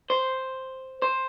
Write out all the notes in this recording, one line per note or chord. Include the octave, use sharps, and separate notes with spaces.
C5
C5